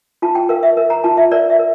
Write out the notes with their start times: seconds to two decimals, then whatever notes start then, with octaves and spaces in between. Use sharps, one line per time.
0.22 F4 A5
0.35 G5
0.49 A#4 F5
0.63 E5
0.77 A#4
0.90 A#5
1.04 F4 A5
1.17 E5
1.31 A#4 D5
1.50 E5
1.59 A#4